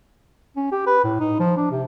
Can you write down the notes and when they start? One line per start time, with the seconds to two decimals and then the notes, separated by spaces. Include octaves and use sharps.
0.56 C#4
0.72 G4
0.87 B4
1.04 A2
1.20 D#4
1.40 F3
1.57 D4
1.71 C3